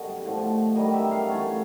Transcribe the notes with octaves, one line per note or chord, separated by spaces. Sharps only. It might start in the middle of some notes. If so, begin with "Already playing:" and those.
Already playing: F#2 D3 G3 B3 D#5
A2 F3 A3
F#2 D#3 G3 D#5
E5
F5
E3 A3 C#4